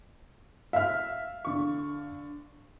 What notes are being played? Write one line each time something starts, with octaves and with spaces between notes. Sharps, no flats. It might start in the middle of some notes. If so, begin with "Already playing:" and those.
E5 F5 F6
D3 C#6